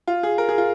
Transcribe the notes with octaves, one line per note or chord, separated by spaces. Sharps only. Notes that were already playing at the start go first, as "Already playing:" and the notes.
F4
G#4
A#4
G#4
F4